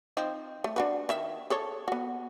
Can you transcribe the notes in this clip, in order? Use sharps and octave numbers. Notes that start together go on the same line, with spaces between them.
F3 C4 D#4
A3
D4 F#4 B4
D#3 E5
G#4 A4 C#5
B3 F#4